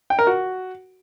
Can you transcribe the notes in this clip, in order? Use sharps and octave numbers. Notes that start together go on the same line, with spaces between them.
G5
A#4
F#4